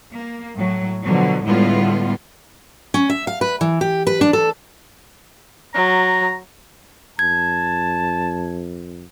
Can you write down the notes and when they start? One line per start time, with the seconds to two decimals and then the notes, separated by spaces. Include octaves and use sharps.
0.15 A#3
0.56 A2 F#3
1.04 B2 D3 F3 F#3
1.44 A2 D3 G3 G#3 B3 F4
2.94 C#4
3.10 E5
3.27 F5
3.41 B4
3.61 E3
3.81 G4
4.07 B4
4.21 D4
4.33 A4
5.74 F#3 A#5
7.19 F2 A5 G#6